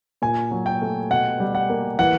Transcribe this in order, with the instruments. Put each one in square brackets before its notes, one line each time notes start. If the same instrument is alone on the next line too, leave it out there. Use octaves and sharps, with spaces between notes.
[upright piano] A#2 [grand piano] G#5
[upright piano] F#3
[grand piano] G5
[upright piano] A3
[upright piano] B2 [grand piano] F#5
[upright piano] G3
[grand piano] F#5
[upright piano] A#3
[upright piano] E3 [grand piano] F#5